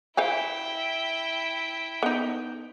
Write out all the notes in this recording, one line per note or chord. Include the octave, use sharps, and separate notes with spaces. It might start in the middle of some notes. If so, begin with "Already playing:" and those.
E4 C5 F5 G5 G#5
B3 D#4